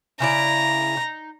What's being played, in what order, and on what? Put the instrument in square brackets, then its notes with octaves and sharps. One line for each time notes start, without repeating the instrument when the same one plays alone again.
[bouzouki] C#3 E4 D5 [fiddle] A#5
[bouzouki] D#4